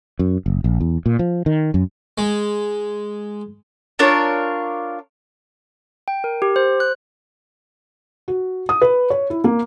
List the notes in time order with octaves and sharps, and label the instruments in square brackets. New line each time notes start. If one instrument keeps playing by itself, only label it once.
[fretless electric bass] F#2
F#1
A#1
E2
A#2
F3
D#3
F#2
[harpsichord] G#3
[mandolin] D4 F4 A#4 C#5
[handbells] G5
A#4
G4
C5
F#6
[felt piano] F#4
D#6
B4
C#5
E4
A#3